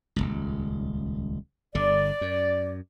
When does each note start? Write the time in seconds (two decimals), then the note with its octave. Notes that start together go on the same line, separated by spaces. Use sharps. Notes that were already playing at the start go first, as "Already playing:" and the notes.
0.16 D#1 G#1 C#2
1.75 G1 D3 D5
2.21 F#2